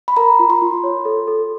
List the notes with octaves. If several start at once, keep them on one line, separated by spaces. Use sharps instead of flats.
B5
A#4 A#5
F4
C6
F4
C#5
A4
A4